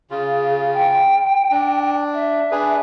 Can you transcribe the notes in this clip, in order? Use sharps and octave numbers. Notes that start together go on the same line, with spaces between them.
C#3 F4 G#4
G5
D4
E5
D4 G#4 B4